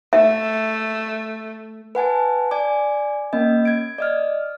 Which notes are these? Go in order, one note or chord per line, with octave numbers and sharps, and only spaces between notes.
A3 E5
B4 F#5 G#5 A5
D5 G#5 D6
A#3 C#4 D#5
G#6 D7
D5 D#5 F6